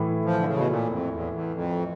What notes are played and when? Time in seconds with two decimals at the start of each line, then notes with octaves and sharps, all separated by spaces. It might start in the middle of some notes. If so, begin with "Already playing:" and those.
Already playing: A2 E3
0.25 F3
0.39 D3
0.47 C#3
0.57 B2
0.68 A#2
0.90 F2
1.11 E2
1.33 E2
1.55 F2